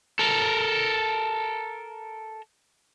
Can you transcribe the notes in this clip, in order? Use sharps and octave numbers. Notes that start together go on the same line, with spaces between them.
A4 A#4